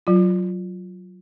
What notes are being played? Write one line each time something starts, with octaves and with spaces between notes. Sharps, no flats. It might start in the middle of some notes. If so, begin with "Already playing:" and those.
F#3 F4